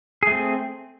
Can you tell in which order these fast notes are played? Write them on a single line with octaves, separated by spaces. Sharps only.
G#4 A3 C4